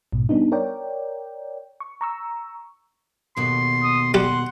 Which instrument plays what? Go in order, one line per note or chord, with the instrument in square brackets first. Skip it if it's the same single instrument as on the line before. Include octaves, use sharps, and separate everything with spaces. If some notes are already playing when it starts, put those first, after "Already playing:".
[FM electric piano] A#1 G#2 B2
G3 B3 D4 D#4
A#4 C#5 D5 G5
C#6
A#5 C#6 E6
[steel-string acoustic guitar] D#2 B2 A4 [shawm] C6
[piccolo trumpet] D#6
[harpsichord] G3 G4 [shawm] F#5 [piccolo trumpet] C6